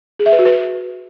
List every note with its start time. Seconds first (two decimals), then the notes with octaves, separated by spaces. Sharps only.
0.19 G#4
0.26 E5
0.32 B4
0.39 F#4
0.45 B4